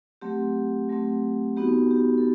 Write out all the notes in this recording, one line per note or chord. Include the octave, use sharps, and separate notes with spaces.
F#3 A3 C4 G4
F#3 A3 C4
B3 D#4 F#4 G4
G4
A4